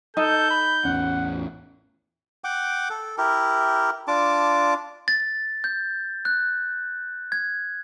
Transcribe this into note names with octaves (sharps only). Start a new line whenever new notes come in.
D#4 A4 G6
B5
A1 E2 C#4 F#5
F#5 G5 D6
A4
E4 G4 A#4
D4 F4 A5 D6
A6
G6
F#6
G#6